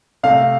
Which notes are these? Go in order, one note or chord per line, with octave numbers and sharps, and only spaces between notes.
C3 A3 F5